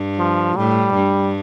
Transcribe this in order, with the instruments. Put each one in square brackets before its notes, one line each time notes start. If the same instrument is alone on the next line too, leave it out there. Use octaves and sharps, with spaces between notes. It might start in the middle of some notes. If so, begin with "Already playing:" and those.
Already playing: [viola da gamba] G2
[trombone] F3
[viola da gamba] A2 [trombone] G3
[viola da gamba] G2